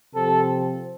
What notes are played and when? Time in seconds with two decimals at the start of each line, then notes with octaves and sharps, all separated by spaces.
0.13 C3 F3 C4 A4